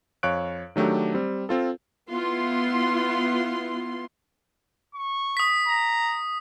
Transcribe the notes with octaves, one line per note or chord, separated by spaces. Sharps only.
F2 C#5 F5 C#6 F#6 D7
D#3 F#3 A3 D4 G4
G3 C4
C4 F4 A4
B3 E4 F4 C6
C#6
D#6 B6
A#5